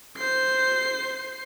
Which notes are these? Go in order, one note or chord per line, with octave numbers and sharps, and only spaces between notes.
C5 C7